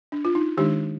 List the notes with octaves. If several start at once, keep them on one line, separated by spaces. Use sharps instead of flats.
D4
F4
D#4
D#3 G#3 D4 D#4 G4